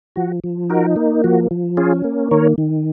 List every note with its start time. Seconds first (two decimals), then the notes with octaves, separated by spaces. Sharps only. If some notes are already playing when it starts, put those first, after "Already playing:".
0.16 F3 F#4
0.44 F3
0.70 D#4 F#4 A#4
0.96 A#3
1.24 F3 F#4
1.51 F3
1.77 C#4 F4 G#4
2.04 A#3
2.31 D#3 A#4 C#5
2.58 D#3